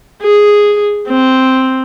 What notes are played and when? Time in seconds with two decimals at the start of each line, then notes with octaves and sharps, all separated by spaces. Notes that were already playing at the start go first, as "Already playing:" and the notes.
0.22 G#4
1.08 C4